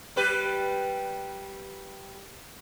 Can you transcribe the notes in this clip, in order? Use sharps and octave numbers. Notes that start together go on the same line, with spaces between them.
G3 G4 B4